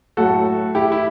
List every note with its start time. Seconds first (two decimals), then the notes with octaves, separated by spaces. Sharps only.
0.17 A2 F#3 A3 F#4 A4
0.75 E4 G4
0.92 E4